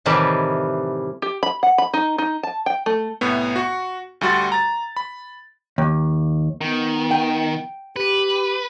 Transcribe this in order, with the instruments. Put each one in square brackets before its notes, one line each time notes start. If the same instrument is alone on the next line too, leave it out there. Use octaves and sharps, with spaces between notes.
[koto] A2 C3 D#3 E3 G3
[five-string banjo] G4
B5
F#5
B5
D#4
D#4
A5
G5
A3
[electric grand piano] C2 A2 B3
F#4 C#6
D2 G3 F#4 C6 A6
A#5 A6
B5
[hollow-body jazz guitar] D#2
[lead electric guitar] D#3 [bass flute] B3
[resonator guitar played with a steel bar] G5
[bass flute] G4 [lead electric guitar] B4